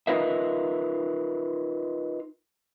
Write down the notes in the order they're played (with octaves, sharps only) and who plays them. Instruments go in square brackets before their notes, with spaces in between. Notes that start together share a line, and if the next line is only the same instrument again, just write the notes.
[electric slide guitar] D#4 F4 A#4 B4 E5